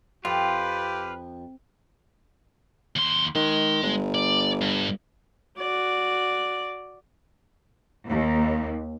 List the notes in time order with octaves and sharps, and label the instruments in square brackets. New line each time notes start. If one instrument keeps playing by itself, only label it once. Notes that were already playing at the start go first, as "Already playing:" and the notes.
[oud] F2 [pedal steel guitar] F4 [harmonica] G4 [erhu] B4
[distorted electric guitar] D#2 C6
[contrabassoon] D#3 [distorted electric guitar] G#3 C6
[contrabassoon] G1
[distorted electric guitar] D5
G2
[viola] F#4 D5
[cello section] D#2